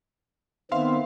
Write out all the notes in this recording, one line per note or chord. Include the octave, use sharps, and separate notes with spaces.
D#3 B3 C4 E5 F5 C6